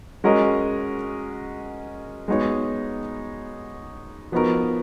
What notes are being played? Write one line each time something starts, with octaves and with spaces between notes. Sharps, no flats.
G#3 C#4 F#4 A#4 D#5
G#3 B3 D#4 F#4 C#5
F3 B3 D#4 F#4 A#4